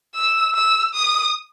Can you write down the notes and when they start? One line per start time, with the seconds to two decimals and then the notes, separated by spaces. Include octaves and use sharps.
0.15 E6
0.55 E6
0.94 D#6